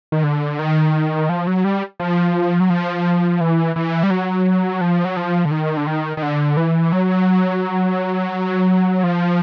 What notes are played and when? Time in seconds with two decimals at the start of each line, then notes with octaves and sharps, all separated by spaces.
0.12 D#3
0.24 D3
0.59 D#3
1.29 F3
1.47 F#3
1.64 G3
2.00 F3
2.60 F#3
2.70 F3
3.41 E3
3.76 E3
4.03 G3
4.10 F#3
4.81 F3
5.05 F#3
5.17 F3
5.45 D3
5.51 D#3
5.77 D3
5.87 D#3
6.17 D#3
6.22 D3
6.57 E3
6.92 F#3
9.04 F3